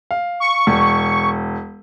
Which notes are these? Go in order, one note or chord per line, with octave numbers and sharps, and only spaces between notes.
F5
C#6
E1